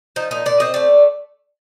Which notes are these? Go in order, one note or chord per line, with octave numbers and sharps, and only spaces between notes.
F3 D#4
A#2 D#4
A#2 D5
C4 D#5
A3 D5